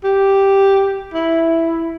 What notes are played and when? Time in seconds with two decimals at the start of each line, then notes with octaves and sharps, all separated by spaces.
0.04 G4
1.14 E4